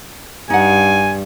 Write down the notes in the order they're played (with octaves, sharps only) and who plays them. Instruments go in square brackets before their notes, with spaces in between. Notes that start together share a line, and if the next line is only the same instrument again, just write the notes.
[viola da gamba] G2 [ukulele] D#4 F#5 [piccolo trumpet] G#5